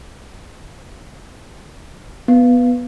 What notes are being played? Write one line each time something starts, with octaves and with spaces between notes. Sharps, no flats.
B3